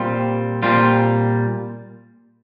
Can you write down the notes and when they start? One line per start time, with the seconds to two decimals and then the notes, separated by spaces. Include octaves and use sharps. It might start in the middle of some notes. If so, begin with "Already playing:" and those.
Already playing: A#2 G3 C4 F4
0.63 A#2 G3 C4 F4